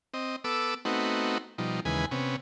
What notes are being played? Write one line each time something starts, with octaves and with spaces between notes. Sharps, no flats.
C4 D#5
B3 A4 D6 E6
A3 B3 C4 D#4 F#4
B2 F3 G3 D#4
D#2 C#3 E3 G#3 B4 G#5
C3 B3 C#4